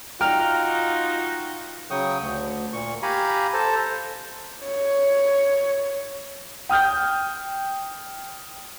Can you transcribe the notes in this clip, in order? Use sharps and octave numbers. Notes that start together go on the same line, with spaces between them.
D#4 F4 F#4 G5 A#5 F6
C#3 F#3 G5 C#6 D#6
D2
A#2 C#6
G4 F5 G#5 A#5 B5
A4 C5 A5 A#5
C#5
G5 D#6 F6 G6